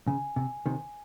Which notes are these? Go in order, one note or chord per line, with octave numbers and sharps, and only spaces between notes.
C#3 G#5
C3 G#5
C3 D#3 G#5